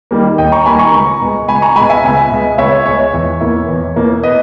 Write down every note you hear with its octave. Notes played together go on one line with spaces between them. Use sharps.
D#3 G3 A#3
D#2 D#5 G5
A#5 C#6
D#3 G3 A#3 G#5 B5
A#5 C#6
C#2
B2 G#3
C#2 G#5 B5
A#5 C#6
B2 G#3 G#5 B5
E5 G#5
C#2
B2 G#3
C#2 C#5 E5
B2 G#3 C#5
E2
B2 A#3 E4
E2
B2 A#3 E4
B4 D#5